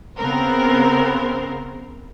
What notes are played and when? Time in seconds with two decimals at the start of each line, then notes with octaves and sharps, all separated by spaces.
0.18 C#3 B3 C4 A#4 C5